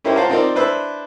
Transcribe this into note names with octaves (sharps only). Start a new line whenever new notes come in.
C#4 E4 G4 A#4 C5 C#5
F4 C5 F5 F#5 A5 A#5
C4 D#4 F4 A#4 C5 D5
D4 E4 B4 C5 E6